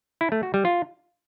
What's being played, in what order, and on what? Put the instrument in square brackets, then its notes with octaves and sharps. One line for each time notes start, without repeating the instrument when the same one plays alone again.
[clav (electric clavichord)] E4
A3
F#4
G3
F4